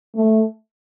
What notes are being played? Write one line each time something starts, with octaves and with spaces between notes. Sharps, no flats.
A3